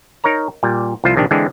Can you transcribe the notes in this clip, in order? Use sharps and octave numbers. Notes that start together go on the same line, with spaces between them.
D#4 A#4 C#5 A#5
A#2 G3
C2 F3 F4 C5
A#1 C3 D#3 D4 G4
D3 E3 G#3 C4 D4